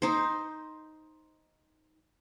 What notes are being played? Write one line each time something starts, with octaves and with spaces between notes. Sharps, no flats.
D#4 C5